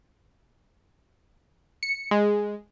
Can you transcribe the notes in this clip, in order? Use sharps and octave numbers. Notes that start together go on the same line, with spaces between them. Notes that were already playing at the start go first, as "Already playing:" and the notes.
C#7
G#3